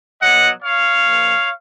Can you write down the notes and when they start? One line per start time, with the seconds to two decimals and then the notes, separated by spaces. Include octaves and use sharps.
0.21 B2 F#3 D#5 F#5
0.63 C#5 F5
1.04 A#2 F3